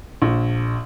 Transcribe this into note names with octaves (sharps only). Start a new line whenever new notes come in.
A#1